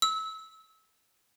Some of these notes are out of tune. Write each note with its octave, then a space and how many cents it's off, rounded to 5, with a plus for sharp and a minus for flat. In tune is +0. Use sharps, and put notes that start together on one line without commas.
E6 -25